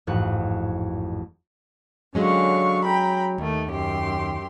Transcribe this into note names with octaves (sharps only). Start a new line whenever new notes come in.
A1 F2 G#2 F#4 F#6
D3 F#3 G#3 C#4 F5 C#6
G5 A#5 B5
D#2 D#3 A3
F#2 G4 C6